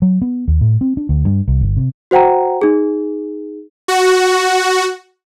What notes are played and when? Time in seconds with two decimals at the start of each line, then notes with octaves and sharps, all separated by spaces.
0.02 F#3
0.22 B3
0.48 D#2
0.61 A2
0.81 C4
0.97 D4
1.09 D2
1.25 G2
1.48 C2
1.61 G1
1.77 C3
2.11 F#4 C5 F#5 G5 A#5
2.61 D#4 G#4
3.88 F#4